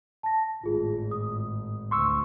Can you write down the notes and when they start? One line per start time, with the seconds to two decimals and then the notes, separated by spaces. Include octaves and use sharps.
0.23 A5 A#6
0.63 G#1 A2 F4 G#4
1.11 D#6
1.91 D2 C6 C#6 E6